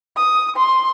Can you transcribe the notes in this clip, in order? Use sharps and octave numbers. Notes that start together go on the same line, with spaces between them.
D#6
C6